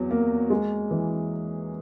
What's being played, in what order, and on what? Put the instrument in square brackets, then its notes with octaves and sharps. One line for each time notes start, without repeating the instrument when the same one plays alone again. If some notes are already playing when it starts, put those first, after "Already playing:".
Already playing: [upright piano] E2 F#3
A#3
G#3
E3